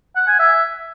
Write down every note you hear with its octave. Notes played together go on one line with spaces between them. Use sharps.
F#5
G#5
E5